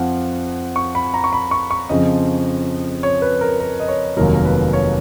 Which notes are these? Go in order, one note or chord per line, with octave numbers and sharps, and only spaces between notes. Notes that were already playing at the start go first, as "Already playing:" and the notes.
Already playing: F2 F3 F5 F#5
C#6
B5
A#5
C#6
B5
C#6
C#6
F2 C#3 F3 D#5
C#5
B4
A#4
A#4
D#5
C#5
F1 D#2 D#3 F#3 A#4
A#4
B4
C#5